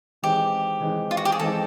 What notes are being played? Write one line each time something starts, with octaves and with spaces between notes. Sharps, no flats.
E3 G#3 C4 D#4 G4
E3 G#3 C4 D#4
F4
F#4
G4
G#4
E3 G#3 C4 D#4 A4